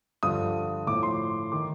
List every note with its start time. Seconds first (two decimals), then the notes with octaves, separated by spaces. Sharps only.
0.23 G2 D3 F3 D#6
0.87 A2 F3 D6
1.03 C6
1.52 D#3 D6